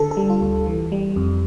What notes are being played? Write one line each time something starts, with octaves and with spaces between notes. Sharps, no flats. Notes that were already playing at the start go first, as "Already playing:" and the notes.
Already playing: D3 A4
A4
G3
F4
D2
E3
G3
F2